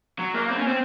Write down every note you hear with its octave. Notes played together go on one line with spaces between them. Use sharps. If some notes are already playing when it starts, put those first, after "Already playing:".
F#3
A#3
C4
C#4
C4